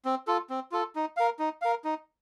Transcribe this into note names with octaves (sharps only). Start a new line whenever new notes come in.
C4
F4 A4
C4
F4 A4
D#4
A#4 F5
D#4
A#4 F5
D#4